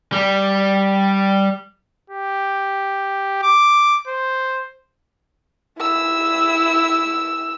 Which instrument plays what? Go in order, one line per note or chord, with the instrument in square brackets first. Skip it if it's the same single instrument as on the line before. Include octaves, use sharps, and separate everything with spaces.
[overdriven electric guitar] G3
[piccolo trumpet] G4
D6
C5
[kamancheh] E4 E6